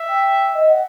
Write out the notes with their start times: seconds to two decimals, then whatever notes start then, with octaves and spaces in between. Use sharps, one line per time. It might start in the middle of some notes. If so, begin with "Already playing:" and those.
Already playing: E5
0.08 G5
0.53 D#5
0.68 F#5